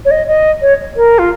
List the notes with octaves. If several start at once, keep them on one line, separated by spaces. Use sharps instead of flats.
C#5
D#5
D#5
C#5
A#4
F4